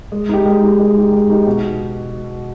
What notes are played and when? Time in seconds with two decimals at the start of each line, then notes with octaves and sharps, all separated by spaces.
0.12 G#3
0.29 D#4 G4
0.45 G#3
0.63 D#4 G4
0.79 G#3
0.96 D#4 G4
1.12 G#3
1.30 D#4 G4
1.47 B2